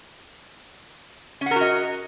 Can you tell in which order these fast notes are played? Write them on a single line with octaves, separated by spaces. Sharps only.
C#4 F#5 A#4 F#4 D#5